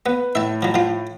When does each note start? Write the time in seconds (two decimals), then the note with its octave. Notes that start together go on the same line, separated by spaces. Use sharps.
0.06 B3 B4
0.35 A2 E5 A5
0.62 F3 F#3
0.74 F3 F4